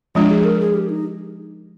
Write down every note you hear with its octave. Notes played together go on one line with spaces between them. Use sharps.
F3 G#3 D4 F4
G#4
A#4
G#4
G4
D#4